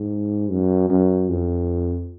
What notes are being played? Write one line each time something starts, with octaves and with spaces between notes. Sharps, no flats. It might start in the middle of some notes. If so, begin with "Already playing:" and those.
Already playing: G#2
F#2
F#2
F2